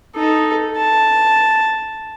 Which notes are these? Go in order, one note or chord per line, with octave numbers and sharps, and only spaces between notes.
D#4 A4
A5